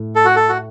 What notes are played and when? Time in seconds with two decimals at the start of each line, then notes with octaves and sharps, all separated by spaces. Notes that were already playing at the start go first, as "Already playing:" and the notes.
Already playing: A2
0.16 A4
0.25 F#4
0.36 A4
0.49 F#4